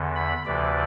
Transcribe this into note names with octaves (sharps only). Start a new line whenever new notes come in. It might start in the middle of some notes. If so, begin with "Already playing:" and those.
Already playing: E2 D3
B5
D2 C3 E3 D5